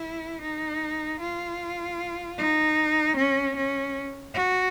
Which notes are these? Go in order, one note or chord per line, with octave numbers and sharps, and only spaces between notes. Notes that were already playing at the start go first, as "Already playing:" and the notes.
Already playing: E4
D#4
F4
D#4
C#4
C#4
F#4